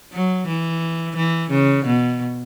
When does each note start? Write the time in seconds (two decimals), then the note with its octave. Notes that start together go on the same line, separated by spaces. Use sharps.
0.13 F#3
0.47 E3
1.16 E3
1.50 C#3
1.85 B2